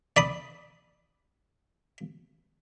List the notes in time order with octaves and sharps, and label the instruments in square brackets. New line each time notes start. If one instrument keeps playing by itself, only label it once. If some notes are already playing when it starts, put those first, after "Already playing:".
[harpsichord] D5 B5 D#6